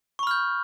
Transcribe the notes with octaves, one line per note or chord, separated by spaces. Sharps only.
B5 C#6 F6 G6